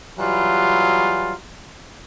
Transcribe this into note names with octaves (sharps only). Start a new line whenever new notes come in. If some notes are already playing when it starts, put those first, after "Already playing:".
E3 F#3 G3 F4